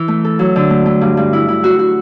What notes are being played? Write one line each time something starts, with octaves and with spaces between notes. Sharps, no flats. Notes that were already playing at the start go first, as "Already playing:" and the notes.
Already playing: E3
A3
A4
F#3
D3
A3
A3
G2
G2
E4
E4
F#4
F#4